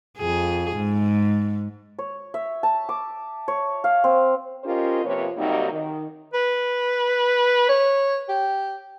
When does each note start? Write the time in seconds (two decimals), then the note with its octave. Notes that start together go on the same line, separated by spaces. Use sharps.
0.18 F2 G#4
0.76 G#2
1.99 C#5
2.34 E5
2.63 A5
2.89 D6
3.48 C#5
3.84 F5
4.04 C4
4.64 C#4 F4 G4 A#4 C5 D#5
5.04 C3 F3 A#3 B4 C#5
5.37 C3 F#3 G3 A#3 D#4
5.72 D#3
6.34 B4
7.69 C#5
8.29 G4